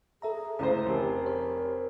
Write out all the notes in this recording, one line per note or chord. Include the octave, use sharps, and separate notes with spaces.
G#4 A4 E5 A#5
C#2 A3 E4 C5 C#5 A#5
F1 G4 A#4
C5 C#5